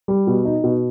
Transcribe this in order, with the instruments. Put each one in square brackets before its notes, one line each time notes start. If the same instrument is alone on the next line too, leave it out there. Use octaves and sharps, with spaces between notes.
[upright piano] G3
B2
D#4
B2